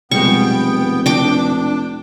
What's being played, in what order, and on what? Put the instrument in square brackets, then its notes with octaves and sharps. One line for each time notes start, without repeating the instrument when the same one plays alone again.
[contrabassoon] F1 [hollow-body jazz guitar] B2 G3 G#3 [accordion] B3 G5 [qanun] C#6
[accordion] D4 [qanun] G5 D6